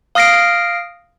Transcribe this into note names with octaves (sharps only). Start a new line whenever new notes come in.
F5 D#6 F6 A#6 C7 D7